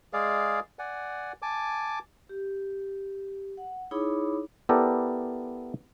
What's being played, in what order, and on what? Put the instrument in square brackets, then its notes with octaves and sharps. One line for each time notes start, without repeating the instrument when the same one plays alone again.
[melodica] G#3 G#4 D5 F5
D5 F#5 G#5
G#5 A5 D6
[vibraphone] G4
F#5
D#4 E4 G#4 C#5 B5 D6
[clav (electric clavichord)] B3 E4 G4 A4 A#4 D5